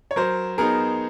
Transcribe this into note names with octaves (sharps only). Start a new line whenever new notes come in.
C#5
F#3 A#4 C5
B3 D#4 G#4 A#4